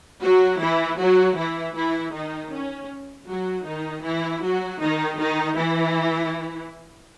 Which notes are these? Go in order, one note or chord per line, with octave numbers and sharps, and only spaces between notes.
F#3 F#4
E3 E4
F#3 F#4
E3 E4
E3 E4
D#3 D#4
C#4
F#3 F#4
D#3 D#4
E3 E4
F#3 F#4
D#3 D#4
D#3 D#4
E3 E4